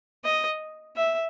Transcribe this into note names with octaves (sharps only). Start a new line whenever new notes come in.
D#5
E5